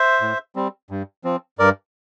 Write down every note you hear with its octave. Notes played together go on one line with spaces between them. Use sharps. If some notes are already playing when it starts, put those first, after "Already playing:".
Already playing: C5 E5
A2
G3 C4
G2
F3 C4
G2 A#4 D5